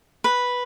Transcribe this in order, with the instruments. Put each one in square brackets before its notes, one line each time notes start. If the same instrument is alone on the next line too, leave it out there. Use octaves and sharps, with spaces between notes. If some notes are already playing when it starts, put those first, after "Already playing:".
[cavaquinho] B4